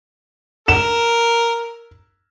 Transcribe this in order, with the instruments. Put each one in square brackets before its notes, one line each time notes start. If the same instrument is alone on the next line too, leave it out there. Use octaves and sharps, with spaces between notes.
[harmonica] A#4 [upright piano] E7